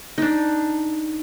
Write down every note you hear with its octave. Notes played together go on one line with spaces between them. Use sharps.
D4 D#4